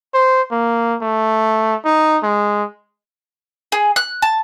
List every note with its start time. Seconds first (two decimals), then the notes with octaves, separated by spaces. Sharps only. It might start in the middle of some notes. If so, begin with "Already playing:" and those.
0.14 C5
0.51 A#3
1.02 A3
1.85 D#4
2.23 G#3
3.72 G#4
3.96 F#6
4.22 A5